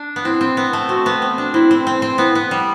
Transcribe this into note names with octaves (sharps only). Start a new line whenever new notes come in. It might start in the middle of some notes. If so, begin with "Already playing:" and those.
Already playing: D4
B3
C4 E4
C4
B3
A3
C4 F#4
B3
C4
D4
C4 E4
C4
C4
C4
B3 E4
B3
G3